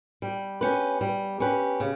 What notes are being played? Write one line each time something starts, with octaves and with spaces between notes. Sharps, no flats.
G3
C#4 G4 B4
G3
C#4 G4 B4
C#3